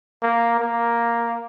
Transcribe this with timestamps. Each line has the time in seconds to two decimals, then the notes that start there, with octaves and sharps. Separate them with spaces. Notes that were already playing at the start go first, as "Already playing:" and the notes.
0.22 A#3
0.60 A#3